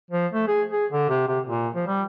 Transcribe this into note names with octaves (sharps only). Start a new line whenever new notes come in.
F3
A3
G#4
G#4
D3
C3
C3
A#2
F3
G3